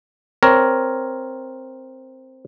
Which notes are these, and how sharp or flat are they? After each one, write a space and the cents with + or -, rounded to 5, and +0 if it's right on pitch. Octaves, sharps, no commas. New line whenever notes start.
C4 +0 A#4 +0 C#5 +15